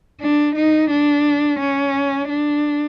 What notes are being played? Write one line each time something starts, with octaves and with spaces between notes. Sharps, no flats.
D4
D#4
D4
C#4
D4